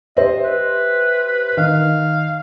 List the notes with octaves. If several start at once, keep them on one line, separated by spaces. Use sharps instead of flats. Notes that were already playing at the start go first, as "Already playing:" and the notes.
G4 C5 D#5 E5
B4
D#3 F5